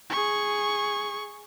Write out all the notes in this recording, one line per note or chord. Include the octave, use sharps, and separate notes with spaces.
G#4 C#6